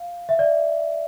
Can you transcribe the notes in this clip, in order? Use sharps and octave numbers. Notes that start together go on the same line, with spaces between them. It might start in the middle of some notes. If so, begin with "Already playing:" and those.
Already playing: F5
E5
D5